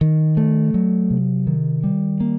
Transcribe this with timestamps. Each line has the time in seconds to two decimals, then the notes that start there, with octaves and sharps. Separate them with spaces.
0.01 D#3
0.37 A3
0.74 F#3
1.11 C3
1.47 D#3
1.84 G3
2.20 A#3